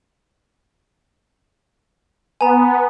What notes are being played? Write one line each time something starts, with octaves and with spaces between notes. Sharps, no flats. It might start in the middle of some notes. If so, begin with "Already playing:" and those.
B3 G#5 A#5